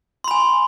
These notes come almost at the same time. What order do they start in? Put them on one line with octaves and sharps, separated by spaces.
C6 B5 G#5